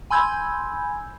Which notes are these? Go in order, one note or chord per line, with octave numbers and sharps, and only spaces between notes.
G#5 B5 C6 E6 G6 G#6